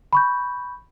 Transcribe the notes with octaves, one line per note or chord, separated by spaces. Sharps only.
B5 C#6 G6